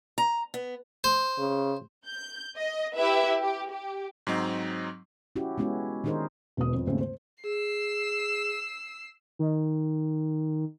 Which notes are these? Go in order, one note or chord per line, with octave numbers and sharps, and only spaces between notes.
A#5
B3
C5
C#3
G6
D#5
E4 G4 B4 E5
G4
G4
G#2 F#3 C4 D#4
C#4 E4 F#4 G4
G#3 B3 C#4 E4 F#4
D#3 D4 D#4 G#4 A#4 C5
E1 B2 D#6
F2
D#2 G#2 C#3 A3 C4
C5
G#4 E6 C7
D#3